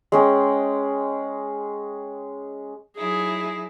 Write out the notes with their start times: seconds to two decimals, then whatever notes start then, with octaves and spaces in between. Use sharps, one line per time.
0.12 G#3 C#4 G5
2.98 F#3 D#4 E4 G#4